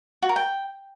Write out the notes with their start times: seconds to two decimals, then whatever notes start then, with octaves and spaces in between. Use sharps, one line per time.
0.22 F#4
0.29 A#4
0.36 G5